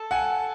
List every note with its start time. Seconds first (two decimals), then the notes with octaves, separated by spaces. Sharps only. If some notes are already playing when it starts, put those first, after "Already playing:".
Already playing: A4
0.11 F#5 G#5